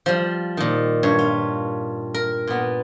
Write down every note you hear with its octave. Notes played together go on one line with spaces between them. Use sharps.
F3 G3
A#2 D#3
G2 C#5
F4
A#4
A#2 B3